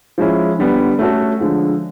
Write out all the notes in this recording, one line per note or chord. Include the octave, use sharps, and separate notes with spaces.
F3 G#3 C#4 E4
D3 G3 B3
A3 C#4 F#4 A4
D3 F3 G#3